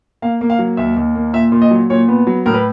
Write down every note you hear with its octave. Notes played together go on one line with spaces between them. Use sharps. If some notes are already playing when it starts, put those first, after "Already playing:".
A#3 F5
A#3
F5
F#3
D#2 E5
D#2
A#3
A#2 E5
A#2
D#5
F#3
A#2 C#5
B3
F#3
A2 A#4
B4